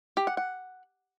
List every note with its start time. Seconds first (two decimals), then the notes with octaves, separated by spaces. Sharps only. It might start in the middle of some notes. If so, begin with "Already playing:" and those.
0.17 G4
0.27 F#5
0.37 F#5